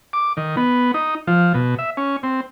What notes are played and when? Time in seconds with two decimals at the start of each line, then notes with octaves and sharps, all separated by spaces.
0.13 D6
0.37 D#3
0.57 B3
0.94 D#4
1.27 F3
1.54 B2
1.79 E5
1.97 C#4
2.23 C4